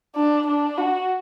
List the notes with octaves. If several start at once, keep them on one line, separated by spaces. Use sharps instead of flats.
D4
D4
F#4